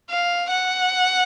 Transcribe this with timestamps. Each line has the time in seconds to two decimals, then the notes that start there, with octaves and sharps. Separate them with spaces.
0.10 F5
0.51 F#5